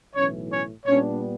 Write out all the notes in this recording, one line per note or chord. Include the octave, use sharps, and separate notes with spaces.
B1 A2 E3 C#4 C#5
C#4 C#5
A#2 G3 B3 C#4 D4 C#5